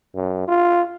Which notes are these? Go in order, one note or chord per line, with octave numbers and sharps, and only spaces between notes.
F#2
F4